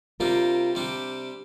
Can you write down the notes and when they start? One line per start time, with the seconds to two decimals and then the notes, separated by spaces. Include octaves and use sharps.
0.20 C3 G3 D4 F4 A#4
0.75 C3 G3 D4